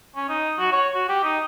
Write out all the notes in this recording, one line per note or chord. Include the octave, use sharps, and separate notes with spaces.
C#4
D#4
F#4
C#5
F#4
G4
D#4